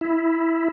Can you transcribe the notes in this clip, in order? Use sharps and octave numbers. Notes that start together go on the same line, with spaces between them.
E4